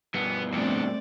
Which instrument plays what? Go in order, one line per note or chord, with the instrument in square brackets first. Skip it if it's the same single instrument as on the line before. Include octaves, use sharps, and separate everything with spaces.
[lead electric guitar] G2 B2 [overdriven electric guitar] B3
[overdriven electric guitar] F2 D4 [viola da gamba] A3 C4 D5